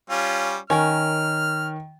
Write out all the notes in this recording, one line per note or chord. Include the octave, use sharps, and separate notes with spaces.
G3 C#4 F4
D#3 C#4 A#4 F6